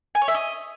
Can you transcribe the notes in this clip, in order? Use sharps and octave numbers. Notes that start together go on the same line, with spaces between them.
G#5
C#5
E5
D#5